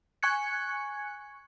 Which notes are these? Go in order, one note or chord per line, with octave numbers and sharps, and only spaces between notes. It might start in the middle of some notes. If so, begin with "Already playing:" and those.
G#5 C#6 F#6 G#6 C#7